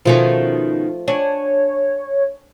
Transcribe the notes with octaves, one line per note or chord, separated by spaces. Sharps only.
B2 D#3 F3 A3 C#4 C6
D4 C#5 F#5 G#5